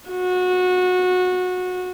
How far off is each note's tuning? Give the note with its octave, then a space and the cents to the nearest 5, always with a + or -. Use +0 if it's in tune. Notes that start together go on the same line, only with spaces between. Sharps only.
F#4 -20